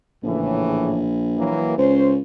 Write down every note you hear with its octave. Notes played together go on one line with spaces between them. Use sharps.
A#1 A2 C#3 E3
E3 F#3 A#3
C#2 C#4 C5